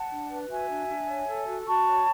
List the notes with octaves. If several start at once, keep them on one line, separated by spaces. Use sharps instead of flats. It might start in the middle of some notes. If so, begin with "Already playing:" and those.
Already playing: F#5 A5
D4
B4
F#4 E5 G#5
D4
D4
C#5
A4
F#4
F#4 A5 C#6
C#5